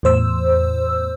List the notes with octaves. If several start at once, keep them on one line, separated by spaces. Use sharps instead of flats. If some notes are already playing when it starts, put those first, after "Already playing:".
E2 A2 C5 E6